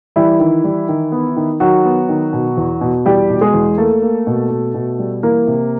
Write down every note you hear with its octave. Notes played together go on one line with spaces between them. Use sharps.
E3 G3 E4
D#3
G3
D#3
B3
D#3
D#3 F#3 F#4
B3
D#3
B2
E2
B2
E2 G3 G4
B2
G#3 G#4
E2
A3 A#3 A4
A#3
B2
B2
B2
G3
E3 A#3 A#4
C3